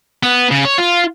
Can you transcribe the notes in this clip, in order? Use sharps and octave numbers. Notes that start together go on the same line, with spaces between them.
B3
C#3
C#5
F4